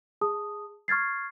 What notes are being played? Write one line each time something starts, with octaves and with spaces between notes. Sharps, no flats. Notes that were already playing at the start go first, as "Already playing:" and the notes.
G#4 A5 D#6
C#6 F6 G#6 A6 C7